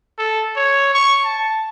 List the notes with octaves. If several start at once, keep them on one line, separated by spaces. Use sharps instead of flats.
A4
C#5
C#6
A5